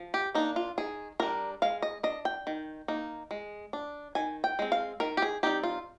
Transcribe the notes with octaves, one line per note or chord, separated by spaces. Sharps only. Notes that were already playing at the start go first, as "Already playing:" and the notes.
Already playing: F3
G4
A#3 D4 D#4
F4
D#3 G#4
G3 D4 A#4
G#3 F5
D#5
D4 D#5
G5
D#3
A#3 D#4
G#3
D4
D#3 G#5
G5
G#3 C4
F5
D#3 A#4
G4
G#4
G3 C4 D#4 G4
F4